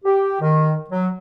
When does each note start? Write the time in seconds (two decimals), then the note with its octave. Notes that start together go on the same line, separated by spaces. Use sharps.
0.05 G4
0.41 D#3
0.90 F#3